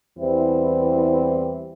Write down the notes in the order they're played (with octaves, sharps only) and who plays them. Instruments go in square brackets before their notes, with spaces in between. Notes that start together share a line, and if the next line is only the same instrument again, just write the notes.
[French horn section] E2 E3 G3 C4 E4